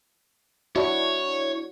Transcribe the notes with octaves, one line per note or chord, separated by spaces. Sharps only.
D4 E4 F#4 C#5